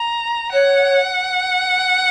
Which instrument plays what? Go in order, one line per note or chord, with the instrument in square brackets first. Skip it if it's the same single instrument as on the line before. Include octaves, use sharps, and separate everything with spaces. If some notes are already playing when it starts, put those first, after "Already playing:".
Already playing: [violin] A#5
[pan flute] C#5 [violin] F#5